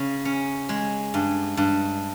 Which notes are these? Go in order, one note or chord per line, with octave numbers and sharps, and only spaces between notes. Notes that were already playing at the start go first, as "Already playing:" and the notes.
Already playing: C#3
C#4
G#3
G2
G2